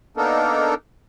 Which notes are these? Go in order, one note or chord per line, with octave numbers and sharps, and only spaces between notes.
A#3 B3 D4 D#4 A4 A#4